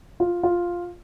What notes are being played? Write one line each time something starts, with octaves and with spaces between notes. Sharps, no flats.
F4
F4